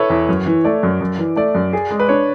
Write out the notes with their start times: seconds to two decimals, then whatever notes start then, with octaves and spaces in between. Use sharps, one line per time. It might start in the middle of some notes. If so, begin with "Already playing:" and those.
Already playing: E4 A4 B4 C#5
0.10 E2
0.29 F#2
0.46 E3
0.64 A3 D5
0.83 F#2
1.01 F#2
1.18 E3
1.36 A3 D5
1.55 F#2
1.73 G#4
1.90 G#3
2.00 B4
2.09 D4 C#5